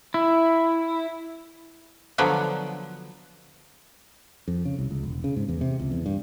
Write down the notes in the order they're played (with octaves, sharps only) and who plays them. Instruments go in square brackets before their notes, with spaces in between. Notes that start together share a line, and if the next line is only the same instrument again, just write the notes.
[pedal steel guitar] E4
[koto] D3 F3 F#3 B3
[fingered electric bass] F2
C#3
C2
C#2
E1
C#3
G#2
E2
C3
C#2
E2
G2